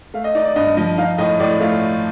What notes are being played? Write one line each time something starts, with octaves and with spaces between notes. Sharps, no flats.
A3 F5
D#5
D#4 D5
D5
G2 D#5
F3 D#5
D#4 F5
A2 D#5
A2 D5
A3 F4